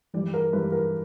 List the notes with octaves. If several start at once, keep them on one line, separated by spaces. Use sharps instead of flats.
G2 E3 D5
A#4
G2 E3 B4
A#4